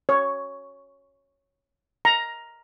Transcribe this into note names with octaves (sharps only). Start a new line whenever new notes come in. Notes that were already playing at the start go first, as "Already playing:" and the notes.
C#5
A#5